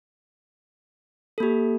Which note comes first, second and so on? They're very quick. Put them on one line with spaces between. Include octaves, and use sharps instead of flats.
A4 A#3 G4